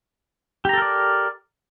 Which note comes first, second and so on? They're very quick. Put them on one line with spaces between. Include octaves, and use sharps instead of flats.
G4 A#5 A4 A#4 D5